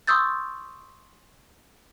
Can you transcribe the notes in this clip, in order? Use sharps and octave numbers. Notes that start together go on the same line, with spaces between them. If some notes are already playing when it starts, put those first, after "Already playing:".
C6 C#6 D#6 E6 G6 A6